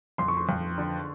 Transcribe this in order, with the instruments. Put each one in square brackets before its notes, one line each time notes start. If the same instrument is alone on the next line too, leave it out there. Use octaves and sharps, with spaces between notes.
[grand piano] F2 [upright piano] C6
[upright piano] C#6
C6
[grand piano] F2
D3